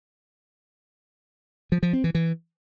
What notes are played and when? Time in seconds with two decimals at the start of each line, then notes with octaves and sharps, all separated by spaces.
1.72 F3
1.83 F3
1.93 C4
2.04 E3
2.15 E3